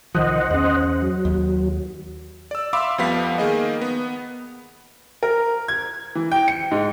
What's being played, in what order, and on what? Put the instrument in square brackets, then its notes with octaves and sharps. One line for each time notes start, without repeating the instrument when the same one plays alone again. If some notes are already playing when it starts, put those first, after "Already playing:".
[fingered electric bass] C2 D#3 F3 [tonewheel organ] C5 D#5 F#5
[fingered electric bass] E2 C#4
[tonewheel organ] F#3
[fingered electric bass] D#2
[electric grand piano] D5 E6
E5 F5 B5 C6 D6 E6
F2 F3 G3 B3 F5 B6
D#3 A#3 G#4 D#5
B3
[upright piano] A#4
G#6
E3
G5
C#7
G#2